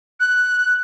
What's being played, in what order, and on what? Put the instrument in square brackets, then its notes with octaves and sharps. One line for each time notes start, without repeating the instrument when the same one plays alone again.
[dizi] F#6